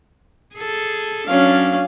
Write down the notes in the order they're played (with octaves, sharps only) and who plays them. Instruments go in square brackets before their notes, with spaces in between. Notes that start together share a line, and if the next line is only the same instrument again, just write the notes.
[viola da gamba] G#4 A4
[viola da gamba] F#3 D4 [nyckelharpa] C#4 F5